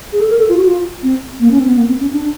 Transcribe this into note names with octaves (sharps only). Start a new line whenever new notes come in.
G#4
A4
A#4
A4
F4
F#4
F4
C4
A#3
C#4
C4
B3
A#3
C4
C#4
D4